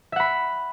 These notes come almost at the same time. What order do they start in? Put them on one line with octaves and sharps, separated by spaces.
E5 F#5 B5